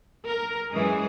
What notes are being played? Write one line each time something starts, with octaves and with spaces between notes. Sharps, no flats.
A#4
F#2 E3 G#3 G#4